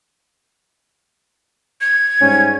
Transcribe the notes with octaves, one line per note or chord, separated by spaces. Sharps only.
G#6
G#2 G3 C#4